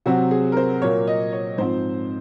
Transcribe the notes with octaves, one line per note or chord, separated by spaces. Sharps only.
C3 F#3 C4 F#4
G#4
A#4
C5
A#2 F#3 A#3 C#5
D#5
C#5
G#2 F3 C4 C5